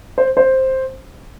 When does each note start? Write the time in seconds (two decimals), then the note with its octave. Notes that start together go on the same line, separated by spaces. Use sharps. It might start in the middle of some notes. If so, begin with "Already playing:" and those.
0.18 C5
0.37 C5